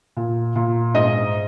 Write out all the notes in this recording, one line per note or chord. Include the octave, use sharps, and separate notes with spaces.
A#2
A#2
G#2 D#5